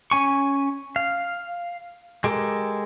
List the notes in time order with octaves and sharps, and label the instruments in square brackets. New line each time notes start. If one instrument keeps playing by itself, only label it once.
[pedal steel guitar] C#4 G#5 C#6
F5
G#3 G4 A4 A#4